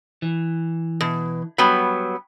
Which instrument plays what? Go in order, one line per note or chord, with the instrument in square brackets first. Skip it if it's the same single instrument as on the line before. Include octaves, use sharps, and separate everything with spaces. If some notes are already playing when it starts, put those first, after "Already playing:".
[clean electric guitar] E3
[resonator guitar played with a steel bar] B2
[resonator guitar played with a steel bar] F#3 G3 B3 [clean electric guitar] B5